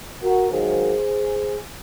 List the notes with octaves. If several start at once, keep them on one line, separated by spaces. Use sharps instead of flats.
F#4 A#4
G#2 D#3 F#3 A#3 G#4 C5